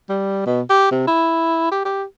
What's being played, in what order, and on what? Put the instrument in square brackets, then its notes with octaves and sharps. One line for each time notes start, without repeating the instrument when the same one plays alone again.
[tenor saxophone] G3
B2
G4
C3
E4
G4
G4